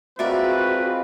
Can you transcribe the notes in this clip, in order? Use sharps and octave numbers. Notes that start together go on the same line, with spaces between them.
G#3 C4 F4 F#4 A#4 B4 D5 E5